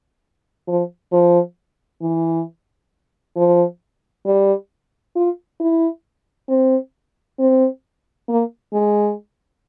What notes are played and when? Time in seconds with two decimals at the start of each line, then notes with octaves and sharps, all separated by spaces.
0.68 F3
1.12 F3
2.02 E3
3.36 F3
4.26 G3
5.16 F4
5.60 E4
6.49 C4
7.39 C4
8.28 A#3
8.73 G#3